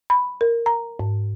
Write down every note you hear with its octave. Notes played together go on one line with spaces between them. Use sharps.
B5
A#4
A#5
G#2